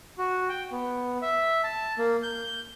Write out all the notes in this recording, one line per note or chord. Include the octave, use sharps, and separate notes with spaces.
F#4
G5
B3
E5
A5
A#3
G6